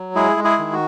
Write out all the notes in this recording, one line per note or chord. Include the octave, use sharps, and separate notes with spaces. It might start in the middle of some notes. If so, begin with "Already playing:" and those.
Already playing: F#3
G#3 E4 G#4
G#3
E4 G#4
D#3
F#4